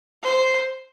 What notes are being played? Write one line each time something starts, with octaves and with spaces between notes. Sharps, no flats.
C5